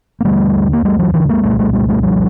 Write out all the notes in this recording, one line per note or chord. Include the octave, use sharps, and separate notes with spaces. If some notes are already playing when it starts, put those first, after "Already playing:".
A#3
D#2 D3 G3 A3
A#3
G3 A3
E3 F#3
D3 E3
G#3 A#3
C2 A#2 G3 A3
G3 A3
G3 A3
G3 A3
F3 G3